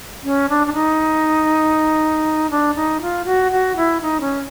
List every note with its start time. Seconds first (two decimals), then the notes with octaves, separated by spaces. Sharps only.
0.24 C#4
0.49 D4
0.67 D4
0.74 D#4
2.50 D4
2.75 D#4
3.01 F4
3.25 F#4
3.52 F#4
3.76 E4
4.01 D#4
4.21 C#4